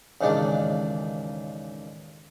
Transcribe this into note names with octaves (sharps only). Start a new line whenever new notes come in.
A1 D#2 C#3 G#3 D4